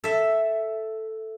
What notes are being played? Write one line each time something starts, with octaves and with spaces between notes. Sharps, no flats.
A4 E5